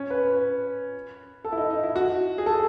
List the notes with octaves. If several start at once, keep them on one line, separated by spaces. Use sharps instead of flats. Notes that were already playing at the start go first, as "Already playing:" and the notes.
Already playing: C#4
B4
B4
A4
E4
D#4
D#4
E4
F#4
G#4
A4